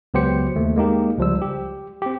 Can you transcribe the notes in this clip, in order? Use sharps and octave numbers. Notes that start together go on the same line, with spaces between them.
C#2 F#3 B3 G4 C5 C#7
D#2 A3
G#3 A#3 D#4 G4
C#2 F3 G3 E6
G4
C4 G4